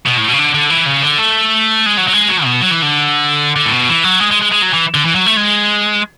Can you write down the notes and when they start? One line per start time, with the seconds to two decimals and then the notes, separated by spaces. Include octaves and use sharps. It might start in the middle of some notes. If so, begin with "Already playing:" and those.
0.06 B2
0.18 A2
0.28 B2
0.33 C#3
0.38 D3
0.54 D3
0.70 E3
0.86 C#3
1.02 D3
1.18 A3
1.86 G#3
1.98 F#3
2.08 F#3
2.14 G#3
2.29 F#3
2.45 B2
2.62 F#3
2.71 E3
2.82 D3
3.56 D3
3.66 A2
3.72 B2
3.89 E3
4.04 F#3
4.20 G#3
4.31 G#3
4.42 G#3
4.52 G#3
4.62 F#3
4.74 E3
4.94 D3
5.05 E3
5.15 F#3
5.26 A3
5.37 G#3